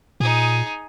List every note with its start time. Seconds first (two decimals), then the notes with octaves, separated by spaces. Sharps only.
0.20 A#2 D#4 G#4